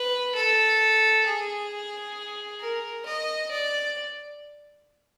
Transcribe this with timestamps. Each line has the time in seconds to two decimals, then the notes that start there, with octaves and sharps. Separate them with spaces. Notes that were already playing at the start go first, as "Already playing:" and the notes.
Already playing: B4
0.35 A4
1.26 G#4
2.60 A#4
3.05 D#5
3.51 D5